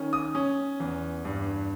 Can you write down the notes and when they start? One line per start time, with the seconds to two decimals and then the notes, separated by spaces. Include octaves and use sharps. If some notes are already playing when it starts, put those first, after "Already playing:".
Already playing: D#3 C#4
0.13 D#6
0.35 C#4
0.80 E2
1.25 G2